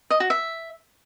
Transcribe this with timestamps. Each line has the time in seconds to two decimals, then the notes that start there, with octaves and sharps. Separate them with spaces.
0.10 D#5
0.20 F#4
0.30 E5